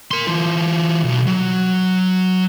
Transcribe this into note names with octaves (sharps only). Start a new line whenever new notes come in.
A#4 C6
E3 F4
B1
F#3